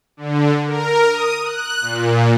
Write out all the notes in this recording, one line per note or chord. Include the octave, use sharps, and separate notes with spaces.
D3
A#4
D#6
F#6
A#2